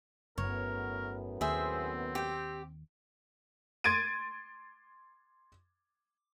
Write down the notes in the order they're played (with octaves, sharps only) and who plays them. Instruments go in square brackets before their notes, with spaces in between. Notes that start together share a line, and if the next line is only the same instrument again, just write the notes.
[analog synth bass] G1 [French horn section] F#2 A2 B3 [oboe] A#4 [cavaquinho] C#5
[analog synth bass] D#2 [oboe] C4 [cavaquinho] G#4 C5 E5
[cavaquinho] G4 G5
[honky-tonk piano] C6 G#6 A6 D7 D#7